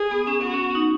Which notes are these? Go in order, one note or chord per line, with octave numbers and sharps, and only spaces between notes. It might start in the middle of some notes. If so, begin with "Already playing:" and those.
Already playing: G#4
B3
C#4
B3 F#4
C#4
D#4